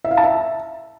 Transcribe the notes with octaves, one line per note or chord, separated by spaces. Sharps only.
E5
F5
A5
E5